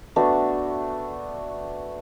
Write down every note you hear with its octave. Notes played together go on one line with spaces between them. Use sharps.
A3 B3 D4 F#4